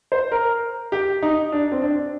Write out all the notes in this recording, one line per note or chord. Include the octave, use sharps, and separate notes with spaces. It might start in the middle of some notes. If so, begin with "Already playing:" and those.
C5
A#4
G4
D#4
D4
C4
D4